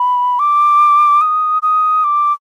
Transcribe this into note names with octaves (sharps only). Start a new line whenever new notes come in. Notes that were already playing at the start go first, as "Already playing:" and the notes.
Already playing: B5
D6
D#6
D#6
D6